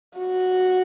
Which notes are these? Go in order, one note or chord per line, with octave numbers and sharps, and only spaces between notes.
F#4